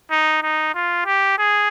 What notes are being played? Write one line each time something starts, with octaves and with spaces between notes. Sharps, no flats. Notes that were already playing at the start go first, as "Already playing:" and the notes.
D#4
D#4
F4
G4
G#4